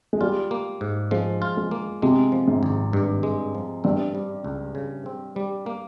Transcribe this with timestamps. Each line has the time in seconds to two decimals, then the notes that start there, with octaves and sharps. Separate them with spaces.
0.13 G#3
0.21 G3 F4
0.51 A#3
0.81 G#2
1.11 F3 G#3
1.42 F4
1.57 G#3
1.71 A#3
2.02 C3 G#3
2.32 F3
2.48 G#2
2.63 G#1
2.93 G2
3.23 G#3
3.55 F3
3.84 G2 C4
4.15 G3
4.44 C#2
4.75 C#3
5.06 C4
5.36 G3
5.66 A#3